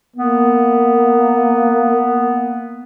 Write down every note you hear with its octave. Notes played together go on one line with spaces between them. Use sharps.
A#3 B3